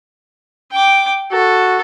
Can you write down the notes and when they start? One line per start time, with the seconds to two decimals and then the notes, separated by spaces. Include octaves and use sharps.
0.72 G5 D6
1.32 F#4 A4